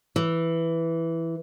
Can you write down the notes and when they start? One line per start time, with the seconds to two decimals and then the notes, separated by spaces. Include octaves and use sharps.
0.16 E3